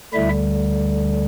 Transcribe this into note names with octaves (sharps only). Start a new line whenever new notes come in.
D2 D3 G3 E4 E5